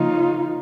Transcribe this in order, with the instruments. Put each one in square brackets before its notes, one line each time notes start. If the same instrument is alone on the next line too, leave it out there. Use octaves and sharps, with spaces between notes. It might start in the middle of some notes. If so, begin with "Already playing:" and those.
Already playing: [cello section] C#3 F3 A#3 D#4 [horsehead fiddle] F4